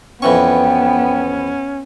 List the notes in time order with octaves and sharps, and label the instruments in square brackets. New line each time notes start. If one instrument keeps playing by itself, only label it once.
[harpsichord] F2 E3 C#6 [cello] B3 [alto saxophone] C#4 [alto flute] G5